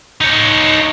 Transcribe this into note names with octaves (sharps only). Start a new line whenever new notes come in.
D#4 C#5